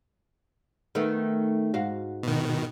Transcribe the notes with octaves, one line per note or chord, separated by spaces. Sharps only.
D#3 A3 B3
G#2 F#4 F5
B2 D#3